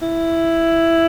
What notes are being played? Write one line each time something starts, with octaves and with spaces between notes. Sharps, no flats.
E4